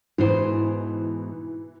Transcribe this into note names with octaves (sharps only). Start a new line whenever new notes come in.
G#2 B2 E3 C5